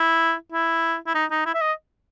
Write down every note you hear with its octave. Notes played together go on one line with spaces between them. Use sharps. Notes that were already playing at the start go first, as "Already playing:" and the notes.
Already playing: E4
E4
E4
D#4
D#4
E4
E5
D#5